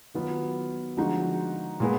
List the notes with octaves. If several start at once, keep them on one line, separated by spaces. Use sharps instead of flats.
D#3 F#3 B3 F4
D3 F3 G#3 D#4 F#4
A#2 G#3 B3